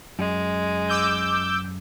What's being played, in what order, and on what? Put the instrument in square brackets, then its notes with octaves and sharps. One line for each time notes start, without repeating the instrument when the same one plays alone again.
[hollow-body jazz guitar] F#2 [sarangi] G#3
[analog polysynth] D6 E6 G6